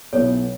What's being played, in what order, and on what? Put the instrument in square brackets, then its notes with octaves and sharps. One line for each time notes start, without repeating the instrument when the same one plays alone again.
[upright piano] B1 B2 F#3 B3 E4 [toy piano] A4 C#5